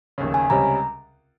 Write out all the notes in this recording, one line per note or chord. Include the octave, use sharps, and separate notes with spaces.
F1 D#2 C#3
G#5
C#2 C3 G3 C#4 A#5